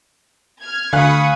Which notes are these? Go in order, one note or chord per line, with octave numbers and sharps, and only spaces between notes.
F6 G#6
D2 F5 G#5 B5 C#6 D#6 F#6